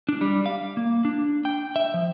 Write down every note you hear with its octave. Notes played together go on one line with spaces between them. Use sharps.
D4
G3
F5
A#3
D4
G5
E5
F3